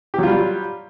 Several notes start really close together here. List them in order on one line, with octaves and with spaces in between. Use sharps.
G4 F#3 F4 G3